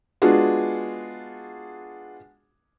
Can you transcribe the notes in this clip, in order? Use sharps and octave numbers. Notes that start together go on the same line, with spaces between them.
G#3 B3 D4 F4 F#4 G#4